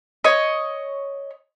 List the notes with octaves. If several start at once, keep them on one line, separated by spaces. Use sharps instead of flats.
C#5 D#5